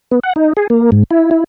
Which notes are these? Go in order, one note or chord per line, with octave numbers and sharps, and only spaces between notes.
B3
F#5
D#4
G#4
A#3
G#2
E4
E4